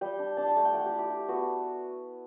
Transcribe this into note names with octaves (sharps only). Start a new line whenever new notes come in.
G3 G5
D4
D4 A5
G5
A3 A5
G5
A3 F#5
G4
E4
G4
D4 G4
B3 F#4